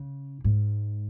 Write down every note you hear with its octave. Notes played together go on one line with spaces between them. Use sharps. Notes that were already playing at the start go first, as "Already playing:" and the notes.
Already playing: C#3
G#2